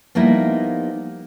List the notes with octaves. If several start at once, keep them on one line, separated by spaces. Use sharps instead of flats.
F3 G3 A#3 B3 D#4 E4